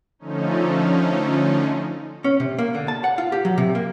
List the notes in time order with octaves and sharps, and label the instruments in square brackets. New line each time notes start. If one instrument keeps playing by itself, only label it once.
[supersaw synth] D3 F3 A3 C#4 D#4
[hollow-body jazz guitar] C#4
C3
A#3
D3
A5
F#5
F4
G4
F#3
C3
A#3